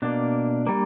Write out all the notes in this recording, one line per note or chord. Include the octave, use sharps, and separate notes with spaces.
B2 A#3 D4
G3 A#3